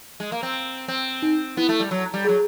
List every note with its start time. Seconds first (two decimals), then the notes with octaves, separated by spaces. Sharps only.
0.20 G#3
0.32 A#3
0.43 C4
0.88 C4
1.22 D#4
1.57 B3 E4
1.69 A3
1.80 G3
1.91 F#3
2.14 G3
2.25 F#3 G#4